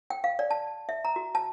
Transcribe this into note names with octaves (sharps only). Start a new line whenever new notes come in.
G5
F5
D5
A5
E5
A#5
F#4
A5